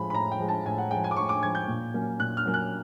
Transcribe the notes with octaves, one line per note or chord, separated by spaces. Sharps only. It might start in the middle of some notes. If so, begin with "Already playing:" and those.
Already playing: A2 F3 G#3 B5
B5
A2 A#5
G5
F3 G#3
A5
A2 G#5
F#5
F3 G#3 G5
G#5
D6
A2 C#6
D6
F3 G#3 G#6
G6
A#2
F#3 A#3 C#4
A#2 F#6
F6
F#3 A#3 C#4
F#6